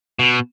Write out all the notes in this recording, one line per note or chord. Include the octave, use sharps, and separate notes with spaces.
B2